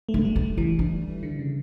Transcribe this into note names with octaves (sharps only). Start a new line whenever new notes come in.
A3
D4
A3
G3
D4
E3 C#4
D4
D3
C#3